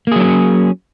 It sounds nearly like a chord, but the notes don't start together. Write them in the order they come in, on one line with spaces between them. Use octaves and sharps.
A#3 G#4 F#3 D4 C#4